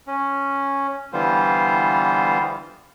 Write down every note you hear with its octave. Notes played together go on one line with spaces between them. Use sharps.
C#4
D3 E3 G3 B3 F4 C5